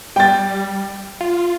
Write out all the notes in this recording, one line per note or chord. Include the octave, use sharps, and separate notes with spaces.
G3 G5 A6
F4